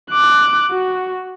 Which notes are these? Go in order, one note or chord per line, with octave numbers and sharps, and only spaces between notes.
D6 F#6
F#4